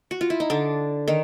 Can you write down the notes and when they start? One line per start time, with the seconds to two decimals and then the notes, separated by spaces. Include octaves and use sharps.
0.11 F#4
0.21 F4
0.30 E4
0.40 D#4
0.50 D3 D4
1.08 D#3 D#4